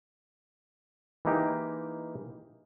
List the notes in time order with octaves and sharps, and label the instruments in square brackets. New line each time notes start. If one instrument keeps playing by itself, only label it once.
[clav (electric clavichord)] E3 G#3 A#3 D#4 G4